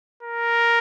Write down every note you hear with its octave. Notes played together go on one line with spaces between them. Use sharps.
A#4